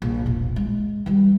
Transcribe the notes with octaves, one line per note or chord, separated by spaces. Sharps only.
A#1
E1 A#1
G#3
E3 G3